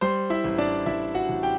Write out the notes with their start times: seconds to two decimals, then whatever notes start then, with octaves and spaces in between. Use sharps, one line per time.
0.01 G3 C5 C6
0.30 E4 E5
0.44 A1
0.58 D4 D5
0.86 A1 E4 E5
1.15 F#4 F#5
1.29 A1
1.43 G4 G5